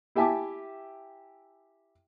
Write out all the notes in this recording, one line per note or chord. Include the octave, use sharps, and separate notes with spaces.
E4 G4 E5 G#5 A5 D6